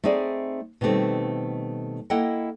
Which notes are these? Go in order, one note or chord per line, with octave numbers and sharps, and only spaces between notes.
A3 C4 D#4 G#4 D5
B2 D#3 G3 A3 C4
A#3 E4 A4 D#5 F#5 G5